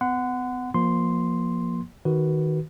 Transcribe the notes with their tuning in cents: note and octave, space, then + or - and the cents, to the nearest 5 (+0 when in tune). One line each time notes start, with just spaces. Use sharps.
B3 +40 F#5 +0 C6 -40
F3 +0 A#3 +20 C6 +0
D#3 +0 F#4 +10 B4 +0